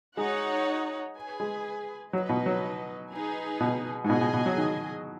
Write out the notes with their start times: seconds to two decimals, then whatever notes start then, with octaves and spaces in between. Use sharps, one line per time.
0.17 G#3 D#4 F#4 C#5 F#5
1.16 G#4 B4 G#5
1.40 G#3
2.13 F#3 D#4 B4 D#5
2.29 B2
2.46 F#3
3.11 D#4 G#4 B4 G#5
3.60 B2
4.04 G#2
4.09 B2 G#4 D#5 G#5
4.21 B2
4.33 B2
4.46 F#3
4.58 D#3